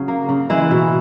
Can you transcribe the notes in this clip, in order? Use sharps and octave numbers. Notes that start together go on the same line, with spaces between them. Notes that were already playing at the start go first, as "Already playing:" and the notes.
Already playing: C#3 F#3
A#3
C#3
E3 G#3 E4
B2